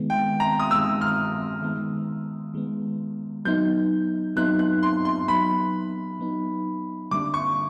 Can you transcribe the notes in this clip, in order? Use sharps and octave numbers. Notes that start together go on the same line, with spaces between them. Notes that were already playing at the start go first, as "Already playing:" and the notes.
Already playing: D#3 G#3 B3
G5
A#5
D#6
D#3 G#3 B3 E6
F6
D#3 G#3 B3
D#3 G#3 B3
F#3 B3 D#4 G6
F#3 B3 D#4 F#6
F#6
C6
C6
F#3 B3 D#4 B5
F#3 B3 D#4
D3 G3 A#3 D4 D6
C#6